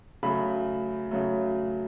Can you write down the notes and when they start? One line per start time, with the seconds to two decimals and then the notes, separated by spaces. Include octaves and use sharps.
0.23 C#3 F#3 A3 B5
1.11 C#3 F#3 A3